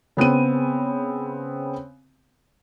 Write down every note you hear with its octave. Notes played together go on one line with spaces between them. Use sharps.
C#3 B3 C4 D#7